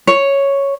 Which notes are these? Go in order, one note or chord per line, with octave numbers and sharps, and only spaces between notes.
C#5